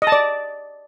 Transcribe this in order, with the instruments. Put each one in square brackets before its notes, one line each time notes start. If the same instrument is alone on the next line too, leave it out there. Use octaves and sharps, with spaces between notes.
[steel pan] D#5
A5
D5